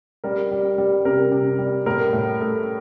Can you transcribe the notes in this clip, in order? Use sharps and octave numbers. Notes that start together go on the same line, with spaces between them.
G3 A#4
G3
G3
C3 A#4
C3
G3
A2 A#4
A2
A3